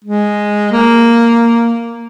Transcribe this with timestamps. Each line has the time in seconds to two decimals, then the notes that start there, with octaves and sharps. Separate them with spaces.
0.05 G#3
0.71 A#3